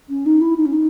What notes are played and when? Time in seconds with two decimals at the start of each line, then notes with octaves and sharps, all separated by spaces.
0.09 C#4
0.26 D#4
0.41 E4
0.57 D#4
0.66 C#4
0.73 D#4